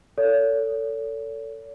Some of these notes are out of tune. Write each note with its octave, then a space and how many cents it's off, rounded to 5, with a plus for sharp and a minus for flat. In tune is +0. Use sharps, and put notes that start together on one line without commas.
A4 +25 C#5 +40